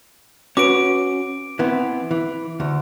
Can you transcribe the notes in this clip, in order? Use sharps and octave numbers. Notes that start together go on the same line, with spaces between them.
C#4 F#4 B4 D6 D7
E3 B3 C4
E3
D2